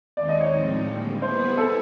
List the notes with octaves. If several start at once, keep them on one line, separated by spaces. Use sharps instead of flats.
D#2 D#3 G#3 C4 D#4 D5
D#5
C#5
A2 F3 G#3 C4 D#4
D3 G3 A#3
G3 B3 E4 G#4 B4 C5
A4